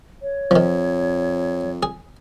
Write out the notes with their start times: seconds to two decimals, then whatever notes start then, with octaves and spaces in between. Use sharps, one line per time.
0.22 C#5
0.51 F2 D#3 F3
1.83 G#4